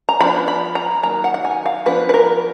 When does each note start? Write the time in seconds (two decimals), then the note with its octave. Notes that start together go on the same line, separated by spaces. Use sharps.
0.09 A#5
0.20 F3 B3 D4 B5
0.48 B5
0.75 A#5
1.03 D#3 F#3 A#3 A#5
1.24 F#5
1.34 F#5
1.45 G#5
1.66 F5
1.86 F3 B3 D4 B4
2.09 B4
2.14 A#4